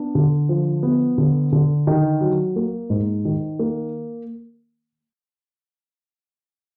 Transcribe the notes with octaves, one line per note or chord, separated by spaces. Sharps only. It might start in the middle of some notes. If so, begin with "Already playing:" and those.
Already playing: B3 D4
D3
F3
B3
D3
D3
D#3
F#3
A#3
G#2
D#3
A#3